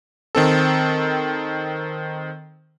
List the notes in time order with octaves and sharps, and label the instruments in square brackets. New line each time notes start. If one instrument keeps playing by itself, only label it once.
[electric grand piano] D#3 C4 A4